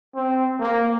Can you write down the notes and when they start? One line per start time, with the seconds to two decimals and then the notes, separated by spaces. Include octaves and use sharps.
0.15 C4
0.60 A#3